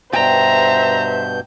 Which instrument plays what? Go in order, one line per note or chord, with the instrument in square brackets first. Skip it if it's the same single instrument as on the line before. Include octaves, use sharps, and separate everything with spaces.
[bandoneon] G2 B2 G6 [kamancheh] C5 E5 [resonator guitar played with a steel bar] G5 [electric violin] A#5